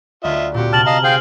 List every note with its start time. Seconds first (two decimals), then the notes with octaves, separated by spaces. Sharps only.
0.24 D2 F4 D#5 E5 B6
0.54 A#2 C4 F#4 G4
0.73 C3 A5 F6 F#7
0.86 D#5 F5 A5 A#5
1.04 C4 G#4 F5 G5